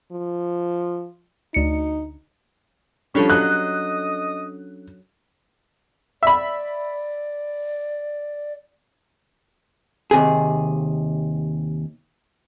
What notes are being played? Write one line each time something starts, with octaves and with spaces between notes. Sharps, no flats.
F3
D2 D#4 C#7
F3 G3 C#4 D4 A4 C#5
F#3 D#5 F#6
D5 E5 B5
D#2 C3 G#4